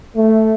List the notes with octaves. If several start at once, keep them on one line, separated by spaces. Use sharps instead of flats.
A3